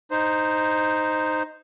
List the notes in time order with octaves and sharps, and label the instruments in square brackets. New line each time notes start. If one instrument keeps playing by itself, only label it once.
[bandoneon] D#4 C5